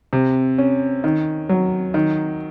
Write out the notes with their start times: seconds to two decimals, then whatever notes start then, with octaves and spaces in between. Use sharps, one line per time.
0.13 C3
0.58 C#4
1.04 D#3
1.49 F#3
1.94 D#3